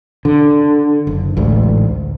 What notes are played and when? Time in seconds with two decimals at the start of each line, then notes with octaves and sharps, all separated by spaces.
0.25 D3
1.07 F#1
1.37 A1 D2 G#2